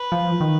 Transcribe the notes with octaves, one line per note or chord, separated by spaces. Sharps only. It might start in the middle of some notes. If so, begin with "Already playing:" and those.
Already playing: B4
F3
D#3